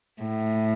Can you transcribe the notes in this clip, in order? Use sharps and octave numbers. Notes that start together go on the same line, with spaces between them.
A2